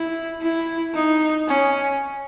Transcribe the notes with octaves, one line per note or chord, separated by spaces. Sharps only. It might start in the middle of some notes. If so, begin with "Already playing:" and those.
Already playing: E4
E4
D#4
C#4